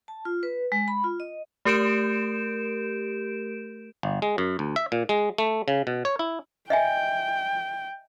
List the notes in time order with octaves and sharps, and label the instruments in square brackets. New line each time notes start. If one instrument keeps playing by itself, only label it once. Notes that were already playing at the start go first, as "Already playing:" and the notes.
[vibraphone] A5
F4
B4
G#3
B5
F4
D#5
[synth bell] A3 G4 A#4 G6 D7 E7
[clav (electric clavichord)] G1
G#3
F#2
D2
E5
A#2
G#3
A3
C#3
B2
C#5
E4
[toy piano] D#5 E5 G#5 [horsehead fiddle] G5